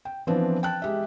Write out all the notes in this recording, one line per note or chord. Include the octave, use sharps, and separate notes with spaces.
G5
E3 F3 B3 C4 D4
G5 A5 F#6
G#3 G4 E5